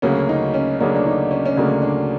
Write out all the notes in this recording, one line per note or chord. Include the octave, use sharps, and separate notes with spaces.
D2 C#3 F#3 A#3 C#4
D#4
C#4
D2 C#3 F#3 A#3 D4
D4
D#4
C#4
C#4
D2 C#3 F#3 A#3 D4
D4